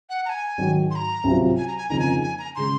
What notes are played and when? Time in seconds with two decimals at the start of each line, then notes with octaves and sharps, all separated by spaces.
0.10 F#5
0.25 A#5
0.29 G#5
0.58 G#2 D#3 F#3
0.91 C6
0.95 A#5
1.24 C2 C3 F#3 C4 F4
1.57 G#5
1.68 A#5
1.78 G#5
1.89 F2 C#3 F3 A#3 D#4 A#5
2.00 G#5
2.22 G#5
2.39 A#5
2.56 C#3 G#3 C6